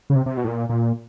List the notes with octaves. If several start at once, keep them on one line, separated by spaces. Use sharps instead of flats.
C#3
C3
C3
B2
A2
A#2
A#2